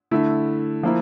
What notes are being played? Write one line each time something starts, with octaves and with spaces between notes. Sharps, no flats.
D3 A3 E4
F3 A#3 E4